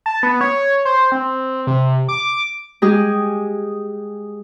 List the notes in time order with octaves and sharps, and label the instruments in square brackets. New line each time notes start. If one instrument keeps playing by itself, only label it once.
[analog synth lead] A5
B3
C#5
C5
C4
C3
D6
[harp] G#3 G4 G#4